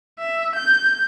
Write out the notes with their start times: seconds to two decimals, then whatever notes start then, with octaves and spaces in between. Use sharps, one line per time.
0.19 E5
0.55 G6